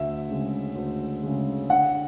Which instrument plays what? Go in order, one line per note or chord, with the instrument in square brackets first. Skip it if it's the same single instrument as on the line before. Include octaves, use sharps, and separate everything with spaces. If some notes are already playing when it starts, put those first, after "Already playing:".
Already playing: [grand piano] D2 [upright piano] E5
[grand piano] C#3 G#3
D2
C#3 G#3
[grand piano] D3 [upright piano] F#5